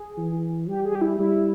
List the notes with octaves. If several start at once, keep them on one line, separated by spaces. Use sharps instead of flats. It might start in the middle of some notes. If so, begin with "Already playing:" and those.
Already playing: G#4
E3
G3 G4
G#4
G4
E4
G3 E4